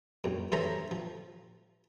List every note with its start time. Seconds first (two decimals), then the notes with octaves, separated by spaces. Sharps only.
0.24 A#1 F#2
0.52 G2 E3 A4 C5 C#5 A#5
0.91 F3